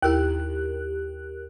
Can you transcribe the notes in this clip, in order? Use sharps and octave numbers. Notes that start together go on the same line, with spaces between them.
D#2 E4 G4 A#4 F#6